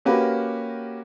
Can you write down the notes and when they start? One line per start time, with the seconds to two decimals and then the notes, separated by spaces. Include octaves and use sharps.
0.05 A#3 C#4 F#4 G4 A#4 B4